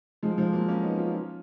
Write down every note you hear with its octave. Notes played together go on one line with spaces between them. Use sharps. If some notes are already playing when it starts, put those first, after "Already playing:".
F3 G#3
F3 G#3
F#3 A#3
A#3 C#4
B3 D#4
C#4 F4
C#4 F4